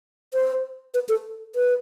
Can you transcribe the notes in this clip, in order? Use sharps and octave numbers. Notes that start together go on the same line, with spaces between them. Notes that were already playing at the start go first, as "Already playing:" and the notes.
C5
B4
A4
B4